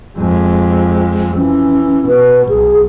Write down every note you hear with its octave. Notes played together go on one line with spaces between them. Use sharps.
F2 G#3
E3 C#4
B2 B4
B1 G#4